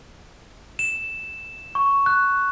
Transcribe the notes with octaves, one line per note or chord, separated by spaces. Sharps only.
E7
C#6
F#6